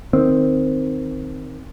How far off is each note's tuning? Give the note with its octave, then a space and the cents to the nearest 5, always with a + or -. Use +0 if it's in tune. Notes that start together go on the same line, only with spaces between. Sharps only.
D#3 +0 C4 +0